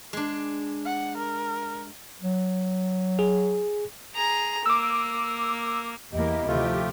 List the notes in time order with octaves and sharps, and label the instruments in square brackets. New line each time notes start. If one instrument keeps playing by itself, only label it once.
[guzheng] G#3 D4
[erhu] F#5
A#4
[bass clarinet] F#3
[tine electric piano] G#4
[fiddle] G#4 A#5
[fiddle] A#3 [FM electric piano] D6 E6
[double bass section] E2 [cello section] A#3 E4 G4 [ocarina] D#5
[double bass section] D2 D#3 F3 [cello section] C3 G4 [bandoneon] A3 F4